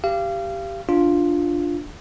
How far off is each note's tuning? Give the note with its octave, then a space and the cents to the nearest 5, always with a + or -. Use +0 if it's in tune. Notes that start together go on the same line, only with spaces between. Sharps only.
G4 +0 F5 -30
D4 +0 F4 +0